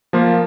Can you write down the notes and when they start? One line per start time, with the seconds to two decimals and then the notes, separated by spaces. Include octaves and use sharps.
0.13 F3 A#3 F4